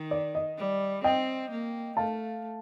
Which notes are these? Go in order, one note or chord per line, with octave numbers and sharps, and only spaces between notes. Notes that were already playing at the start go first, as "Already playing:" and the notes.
Already playing: D#3
D5
D#5
G3
C4 D#5 G5
A#3
A3 F5 A5